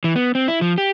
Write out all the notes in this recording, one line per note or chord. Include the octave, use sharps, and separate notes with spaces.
E3
B3
C4
E4
F3
G4